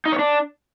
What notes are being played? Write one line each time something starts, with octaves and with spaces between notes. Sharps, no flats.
D#4
C#5
D4